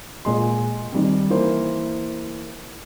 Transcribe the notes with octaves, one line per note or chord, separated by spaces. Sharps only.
A#2 G#3 C6
D#3 G3 C4
E3 A#3 A#4 C5